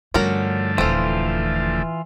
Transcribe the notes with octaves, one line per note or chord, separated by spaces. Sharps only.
G2 D3 F3 A3 C#4 F#4 A#4
D#1 D#2 E3 C4 F4 A4